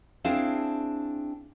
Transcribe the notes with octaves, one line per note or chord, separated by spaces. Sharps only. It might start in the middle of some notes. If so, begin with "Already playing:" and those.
C4 D4 E4 G#4 F5 A5